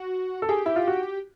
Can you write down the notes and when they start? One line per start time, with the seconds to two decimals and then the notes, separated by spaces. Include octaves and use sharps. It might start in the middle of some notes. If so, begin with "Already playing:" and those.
Already playing: F#4
0.42 A4
0.49 G4 G#4
0.66 E4
0.76 F4
0.87 F#4